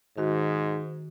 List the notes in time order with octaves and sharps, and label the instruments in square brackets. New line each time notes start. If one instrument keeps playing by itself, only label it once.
[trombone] G#2 [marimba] D#3 F#4